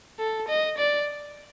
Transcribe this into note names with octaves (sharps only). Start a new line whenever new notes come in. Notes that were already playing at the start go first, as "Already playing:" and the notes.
A4
D#5
D5